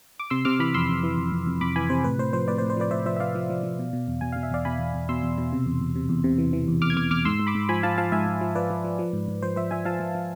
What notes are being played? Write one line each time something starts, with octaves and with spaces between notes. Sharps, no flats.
D6
C3 C6 E6
C3 D6 F6
E3 B5 D6
F2 C6 E6
F2
E3
F2
F2
F2
F2 B5 D6
E3 G#5 B5
C3 C5
A2 B4
A2 C5
F3 C5
A2 B4 D5
C5
A2
C5
F3 B4 D5
A2 C5 E5
F3 C5 E5
E5
F3 D5 F5
F3
F3
F3
B2
B2
E2
B2 G#5
B2 F5
E5
E2 D5 F5
B2 G#5 B5
E2
E2
B2 C6 E6
E2
B2
C3
E2
E2
C3
E2
C3
E3
E3
E2
E2 D6 F6
G#6
E2 D6 F6
E2 D6 F6
G#2 C6 E6
G#2
B5 D6
G#2
F3 G#5 B5
F3 F5 A5
F3 F5 A5
G#2 E5 G#5
G#2
F3
F3 B4 D5
F3
F3
F3
G#2
G#2
F3 C5
F3 C5 E5
F3 E5 G#5
F3 F5 A5
F3
F3